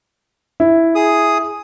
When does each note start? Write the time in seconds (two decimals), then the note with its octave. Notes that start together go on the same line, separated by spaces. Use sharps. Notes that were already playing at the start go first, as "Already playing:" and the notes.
0.60 E4
0.95 G#4 D#6